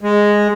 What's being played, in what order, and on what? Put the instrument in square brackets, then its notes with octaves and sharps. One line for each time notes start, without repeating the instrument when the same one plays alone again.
[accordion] G#3